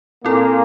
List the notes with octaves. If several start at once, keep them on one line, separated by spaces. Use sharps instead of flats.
A#2 A#3 C4 E4 A4